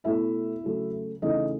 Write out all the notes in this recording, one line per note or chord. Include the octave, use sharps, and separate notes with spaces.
B2 A3 E4 E5
C#3 F#3 A3
C#3 E3 A3 D#4 D#5